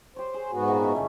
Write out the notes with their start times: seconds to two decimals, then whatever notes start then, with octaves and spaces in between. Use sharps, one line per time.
0.16 G4 C5 C#5
0.34 G#4
0.52 G#2 B3 F#4
0.68 A#2 D#3 E3
0.82 C#4 E4 G#5
0.95 F#2 C#3 G3 A3 C#4